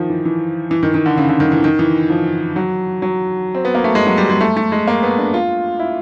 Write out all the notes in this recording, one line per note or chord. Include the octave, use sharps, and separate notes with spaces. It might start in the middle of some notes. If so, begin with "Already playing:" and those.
Already playing: D#3 F3
E3
E3
E3
D#3
D#3
D3
C#3
D3
D#3
E3
D#3
E3
F3
F#3
F#3
C4
B3
A#3
A3
G#3
F#3
G3
G#3
A3
A3
G#3
A#3
B3
D4
F4
E4